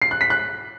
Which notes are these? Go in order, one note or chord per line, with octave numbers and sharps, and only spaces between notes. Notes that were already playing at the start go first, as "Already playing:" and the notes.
C7
F#6
B6
F#6